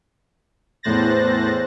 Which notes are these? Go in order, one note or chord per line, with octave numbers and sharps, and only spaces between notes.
E2 A2 C5 F#6 A6 A#6